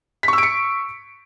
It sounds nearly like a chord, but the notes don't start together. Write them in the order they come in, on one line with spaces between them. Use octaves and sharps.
B6 C#6 E6 D7 C#7